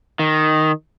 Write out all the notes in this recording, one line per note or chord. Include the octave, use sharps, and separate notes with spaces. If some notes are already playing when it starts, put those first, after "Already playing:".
D#3